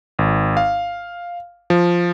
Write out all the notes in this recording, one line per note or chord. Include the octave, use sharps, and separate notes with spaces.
G#1
F5
F3